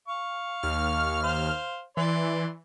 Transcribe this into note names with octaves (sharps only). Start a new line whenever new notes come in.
F5 C#6
D#2 F6
C5 F5
E3 D5 C6